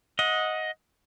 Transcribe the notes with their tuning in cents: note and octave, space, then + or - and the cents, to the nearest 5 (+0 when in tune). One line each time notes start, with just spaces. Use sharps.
D#5 +15 F#5 -20